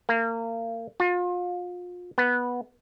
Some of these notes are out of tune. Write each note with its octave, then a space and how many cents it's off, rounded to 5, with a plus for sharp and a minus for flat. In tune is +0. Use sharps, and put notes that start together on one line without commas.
A#3 -30
F4 +30
B3 -10